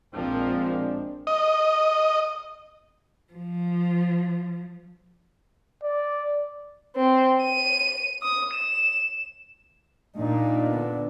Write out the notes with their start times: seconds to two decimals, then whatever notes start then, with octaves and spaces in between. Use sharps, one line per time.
0.14 A#1 F3 G#3 C4 D4 A#4
1.27 D#5
3.33 F3
5.83 D5
6.96 C4
7.44 D#7
8.22 D#6
8.53 E7
10.18 A#2 D4 D#4
10.70 D3 B3